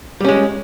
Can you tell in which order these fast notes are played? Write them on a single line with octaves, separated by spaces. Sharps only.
G3 C#4 G#3